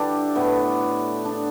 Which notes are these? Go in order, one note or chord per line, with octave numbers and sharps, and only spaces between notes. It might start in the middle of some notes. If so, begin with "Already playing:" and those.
Already playing: D3 G3 D4 E4 G4 A4 B4 D5
A2 A3 B3
D4